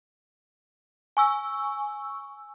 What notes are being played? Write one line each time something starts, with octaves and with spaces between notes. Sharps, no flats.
G#5 C#6 E6